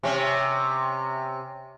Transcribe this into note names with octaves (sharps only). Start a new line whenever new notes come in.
C3 C#4